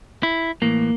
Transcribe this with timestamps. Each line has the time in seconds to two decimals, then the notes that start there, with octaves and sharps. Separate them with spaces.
0.23 E4
0.62 A2 E3 A#3